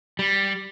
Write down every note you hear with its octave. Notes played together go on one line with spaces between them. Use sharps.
G3